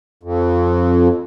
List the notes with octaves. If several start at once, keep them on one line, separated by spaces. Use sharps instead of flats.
F2